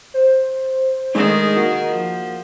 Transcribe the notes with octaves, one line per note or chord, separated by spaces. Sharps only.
C5
D#3 G#3 A3 D4 D#4 G#4
A#3 F#4
F3